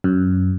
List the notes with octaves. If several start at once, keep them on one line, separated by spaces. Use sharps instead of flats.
F#2